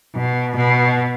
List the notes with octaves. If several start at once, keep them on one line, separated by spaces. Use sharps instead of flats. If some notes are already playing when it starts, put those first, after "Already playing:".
B2
B2